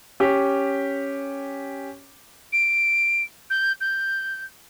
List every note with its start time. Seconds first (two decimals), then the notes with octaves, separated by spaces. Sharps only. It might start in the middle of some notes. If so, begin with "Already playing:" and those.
0.20 C#4 G4
2.52 D7
3.50 G6
3.80 G6